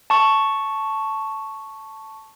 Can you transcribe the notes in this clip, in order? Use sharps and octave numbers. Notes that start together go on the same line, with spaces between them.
A5 C#6